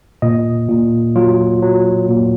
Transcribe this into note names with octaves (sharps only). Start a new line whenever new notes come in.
A#2 D#5
A#2
F#3 F4
F#3
A#2